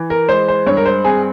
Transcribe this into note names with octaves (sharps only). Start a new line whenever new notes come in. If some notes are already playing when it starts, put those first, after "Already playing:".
Already playing: E3
A#4
G#3 C5
C5
G2 C#5
A#4
C5
C4 G#4